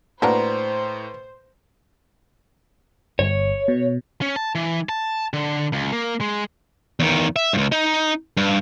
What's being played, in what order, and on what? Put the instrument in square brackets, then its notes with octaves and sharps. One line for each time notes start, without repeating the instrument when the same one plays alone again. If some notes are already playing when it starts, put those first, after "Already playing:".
[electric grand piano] A2 [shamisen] A#3 D4 F#4 [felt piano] B4 A#5 [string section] C5
[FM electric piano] G1 [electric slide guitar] C#5
[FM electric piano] B2
[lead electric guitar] C#4
A5
E3
A5
D3
C#2
A#3
G#3
[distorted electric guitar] E2 D#3
E5
C#2 G2
D#4
G2